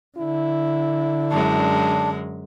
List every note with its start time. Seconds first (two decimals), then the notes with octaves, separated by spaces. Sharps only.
0.18 D3 E4
1.31 F#2 G#3 D4